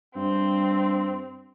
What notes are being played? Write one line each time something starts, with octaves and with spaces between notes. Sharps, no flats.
G2 C4